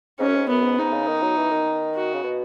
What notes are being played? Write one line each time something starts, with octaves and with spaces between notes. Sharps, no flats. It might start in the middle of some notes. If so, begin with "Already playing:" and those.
G#2 C#4
F#2
G#2
F#2 B3
G#2
G#2 D#4
C#3
D#3
F#3
E3
D#3
F#4
C#3
B2